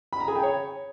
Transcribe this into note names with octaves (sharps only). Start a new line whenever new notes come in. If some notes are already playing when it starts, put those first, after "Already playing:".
B5
A#5
G#4
G5
C#5